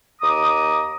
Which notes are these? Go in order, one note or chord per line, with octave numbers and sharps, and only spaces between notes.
D#2 A#5 D6 D#6